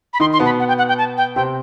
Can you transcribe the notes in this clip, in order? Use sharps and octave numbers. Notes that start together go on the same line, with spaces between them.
B5
D#3 D#4 C6
C6
B2 B3
B5
F#5
G5
F#5
G5
A5
G5
C3 C4 G5